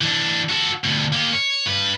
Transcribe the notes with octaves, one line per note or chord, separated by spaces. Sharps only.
E3 D4
F#4 A4
D2 B2
A#3 G4
C#5
G2 B4